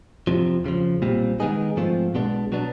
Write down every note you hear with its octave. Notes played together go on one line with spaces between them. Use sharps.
F2 C3 F3
F2 C#3 F3
B1 A#2 G3 C4
D#3 G#3 B3 D#4 G#4
G#2 F3 A3 C4 F4
B1 B2 G#3 B3 D4
B2 F#3 B3 D4